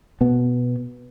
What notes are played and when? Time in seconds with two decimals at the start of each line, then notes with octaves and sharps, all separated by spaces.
0.21 B2 B3